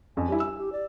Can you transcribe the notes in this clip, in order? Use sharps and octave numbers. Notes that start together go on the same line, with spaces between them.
F2 G#5
G3 D4 E4
E6
G4
D5